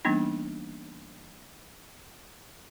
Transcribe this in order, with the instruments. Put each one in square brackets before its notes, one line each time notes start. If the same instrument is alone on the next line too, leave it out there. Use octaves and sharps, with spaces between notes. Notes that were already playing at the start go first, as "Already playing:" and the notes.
[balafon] E3 G3 A#3 B3 D4 D#4